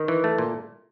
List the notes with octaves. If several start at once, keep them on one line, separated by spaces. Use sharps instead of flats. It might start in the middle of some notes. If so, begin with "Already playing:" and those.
Already playing: D#3
E3
A3
A#2